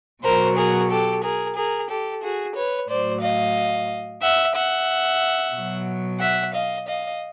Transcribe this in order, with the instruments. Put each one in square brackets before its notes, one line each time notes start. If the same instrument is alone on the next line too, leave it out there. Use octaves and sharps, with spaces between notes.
[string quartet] B2 F#3 A#4 C5
G#4 A#4
G4 A4
G#4 A#4
G#4 A#4
G4 A4
F#4 G#4
B4 C#5
A2 F#3 C5 D5
D#5 F5
E5 F#5
E5 F#5
B2 F#3
E5 F#5
D#5 F5
D#5 F5